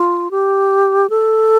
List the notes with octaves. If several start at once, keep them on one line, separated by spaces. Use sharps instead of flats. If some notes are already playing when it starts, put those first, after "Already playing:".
Already playing: F4
G4
A4